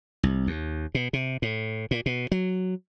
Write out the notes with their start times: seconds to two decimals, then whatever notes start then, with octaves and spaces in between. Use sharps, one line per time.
0.23 C2
0.47 D#2
0.95 B2
1.13 C3
1.42 A2
1.91 A#2
2.06 B2
2.32 F#3